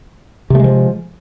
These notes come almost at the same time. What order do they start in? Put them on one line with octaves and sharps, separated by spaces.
C3 A3 G#3 F3